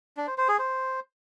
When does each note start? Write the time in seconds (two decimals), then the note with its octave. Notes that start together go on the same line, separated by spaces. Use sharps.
0.17 D4
0.27 C5
0.38 C5
0.48 G#4
0.59 C5